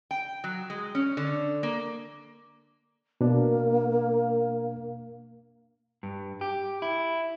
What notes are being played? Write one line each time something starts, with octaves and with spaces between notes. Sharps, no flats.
G5
F#3
G#3
C#4
D3
A#3
B2 A#3 D4
G2
G4
E4